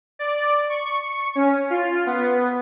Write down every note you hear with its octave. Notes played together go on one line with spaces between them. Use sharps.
D5
C#6
C#4
F4
B3